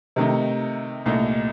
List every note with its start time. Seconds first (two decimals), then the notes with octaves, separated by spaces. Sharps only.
0.16 C3 D#3 A3 D#4
1.06 C2 A#2 A3 D#4